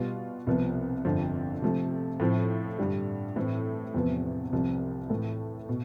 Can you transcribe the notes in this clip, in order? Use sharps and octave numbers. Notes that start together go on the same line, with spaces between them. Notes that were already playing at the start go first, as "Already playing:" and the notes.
Already playing: B2 G3 B3 F4
C2 C3 F3 B3
G1 F2 D3 F3 C4
C3 F3 A3
A2 F3 C4
G2 D3 G3
A2 E3 A3 C4
E2 C3 F3 B3
C2 C3 F3
A2 E3 A3
B2